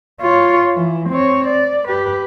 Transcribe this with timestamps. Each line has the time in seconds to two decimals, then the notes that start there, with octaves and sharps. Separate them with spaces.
0.21 F4 C#5
0.75 E3
1.09 C4 C#5
1.47 D5
1.88 G4 B4